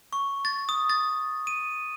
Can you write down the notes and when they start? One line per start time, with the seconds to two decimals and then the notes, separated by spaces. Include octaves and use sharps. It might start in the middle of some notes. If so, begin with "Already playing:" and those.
0.13 C#6
0.45 A6
0.69 D#6
0.90 A6
1.47 D#7